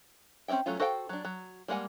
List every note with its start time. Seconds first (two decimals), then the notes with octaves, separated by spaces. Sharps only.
0.48 C4 C#4 D5 E5 G5
0.66 F#3 A3 C#4 F4
0.80 F#4 A4 C5 F5 G5
1.09 F#3 D4
1.25 F#3
1.68 G3 G#3 A#3 F#5 G#5